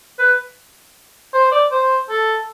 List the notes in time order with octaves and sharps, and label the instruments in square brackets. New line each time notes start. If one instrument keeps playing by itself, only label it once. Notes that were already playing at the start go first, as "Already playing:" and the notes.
[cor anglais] B4
C5
D5
C5
A4